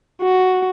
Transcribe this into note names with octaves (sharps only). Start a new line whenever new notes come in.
F#4